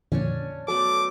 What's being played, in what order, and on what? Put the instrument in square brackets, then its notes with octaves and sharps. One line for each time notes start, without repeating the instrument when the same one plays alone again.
[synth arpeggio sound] F2 A#2 D3 [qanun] C#4 D4 C#5
[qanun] F#3 A3 B3 [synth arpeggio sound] A4 [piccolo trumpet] D6